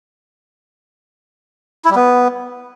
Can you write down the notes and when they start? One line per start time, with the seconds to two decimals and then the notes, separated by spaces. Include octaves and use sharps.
1.85 E4
1.90 G3
1.95 B3